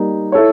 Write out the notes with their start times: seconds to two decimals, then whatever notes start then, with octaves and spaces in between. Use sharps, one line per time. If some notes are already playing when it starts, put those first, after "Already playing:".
Already playing: G3 A#3 D#4
0.32 E4 A4 C#5